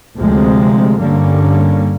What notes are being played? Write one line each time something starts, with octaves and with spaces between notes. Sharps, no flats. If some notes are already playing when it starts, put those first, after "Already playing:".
D2 C3 F3 G#3
G2 D3 G3 A#3 C#4